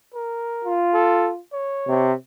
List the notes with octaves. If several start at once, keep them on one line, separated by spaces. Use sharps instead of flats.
A#4
F4
A4
C#5
C3